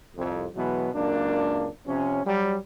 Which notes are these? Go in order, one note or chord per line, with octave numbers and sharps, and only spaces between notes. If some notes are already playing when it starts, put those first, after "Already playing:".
C2 F2
B2 E3 F#3 G#3 B3
C#2 F#2 A#3 D4
C3 F3 C#4
F#3 G3